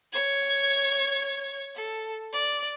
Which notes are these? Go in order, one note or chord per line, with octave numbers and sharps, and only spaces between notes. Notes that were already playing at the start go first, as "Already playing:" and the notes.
C#5 G#6
A4
D5